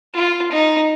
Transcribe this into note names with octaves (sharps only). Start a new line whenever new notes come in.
F4
D#4